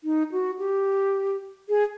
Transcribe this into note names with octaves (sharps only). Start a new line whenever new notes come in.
D#4
F#4
G4
G#4